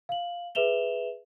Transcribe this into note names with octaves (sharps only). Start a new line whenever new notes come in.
F5 F#7
G#4 B4 E5 E7 F7 G7